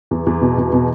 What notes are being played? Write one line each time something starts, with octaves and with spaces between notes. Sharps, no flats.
E2
E2
B2
E2
B2